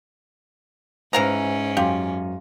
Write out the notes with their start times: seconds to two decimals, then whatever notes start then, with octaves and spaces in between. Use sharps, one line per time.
1.13 G#2 E3 C#4 C5 F5 A#5
1.77 F#2 G4 F5 C6 D6